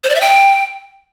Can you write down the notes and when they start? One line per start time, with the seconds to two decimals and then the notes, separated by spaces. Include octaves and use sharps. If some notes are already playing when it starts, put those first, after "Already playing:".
0.04 C5
0.10 D5
0.15 E5
0.21 G5